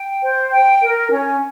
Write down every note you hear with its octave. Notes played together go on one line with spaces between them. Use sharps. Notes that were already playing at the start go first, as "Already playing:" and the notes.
Already playing: G5
C5
G5
A#4
C#4